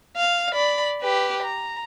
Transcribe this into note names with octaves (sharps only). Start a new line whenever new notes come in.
F5
D5 B5
G4 B4
A#5